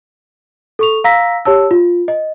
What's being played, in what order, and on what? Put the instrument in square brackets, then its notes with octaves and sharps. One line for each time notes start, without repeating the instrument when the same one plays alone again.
[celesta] A4 C#6 F7
F5 A#5 E6 A#6 B6
G4 C#5 A5 E6
F4
D#5